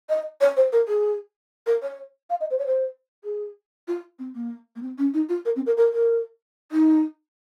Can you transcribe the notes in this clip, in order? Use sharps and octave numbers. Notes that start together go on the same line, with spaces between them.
D#5
C#5
C5
A#4
G#4
A#4
C#5
F5
D#5
C5
C#5
C5
G#4
F4
C4
A#3
A#3
C4
C#4
D#4
F4
A#4
C4
A#4
A#4
A#4
D#4